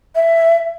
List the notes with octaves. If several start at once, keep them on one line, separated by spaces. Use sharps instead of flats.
E5